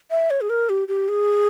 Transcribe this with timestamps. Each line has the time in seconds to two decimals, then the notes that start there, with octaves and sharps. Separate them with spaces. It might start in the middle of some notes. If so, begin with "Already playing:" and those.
0.11 E5
0.30 C#5
0.41 G#4
0.50 A#4
0.69 G4
0.88 G4
1.08 G#4